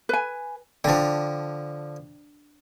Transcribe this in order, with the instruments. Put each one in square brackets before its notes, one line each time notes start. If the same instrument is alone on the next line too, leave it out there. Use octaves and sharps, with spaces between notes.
[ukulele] B4 G#5
[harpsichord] D3 F3 [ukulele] D4 G5